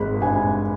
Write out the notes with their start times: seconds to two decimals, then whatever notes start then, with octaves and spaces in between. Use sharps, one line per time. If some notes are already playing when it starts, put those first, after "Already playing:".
Already playing: G#1 G#3 B5
0.22 G2 G#5